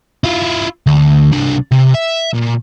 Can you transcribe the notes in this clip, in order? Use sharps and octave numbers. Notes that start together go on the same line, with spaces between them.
E4 F4
D2
C2 D4
C3
E5
A#2